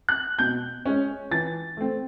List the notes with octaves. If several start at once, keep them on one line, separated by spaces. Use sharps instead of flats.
F#6
B2 G6
G#3 C#4
E3 A6
A3 C4